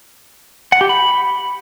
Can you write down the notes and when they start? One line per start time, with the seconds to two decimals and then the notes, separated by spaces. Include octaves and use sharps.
0.72 F#5
0.81 G4
0.89 B5